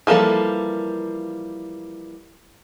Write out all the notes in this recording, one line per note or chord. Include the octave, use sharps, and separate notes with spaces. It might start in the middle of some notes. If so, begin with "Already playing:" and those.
E3 F3 G3 A#3 A4